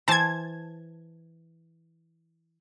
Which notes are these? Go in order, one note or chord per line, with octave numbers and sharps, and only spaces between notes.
E3 C5 A5 G#6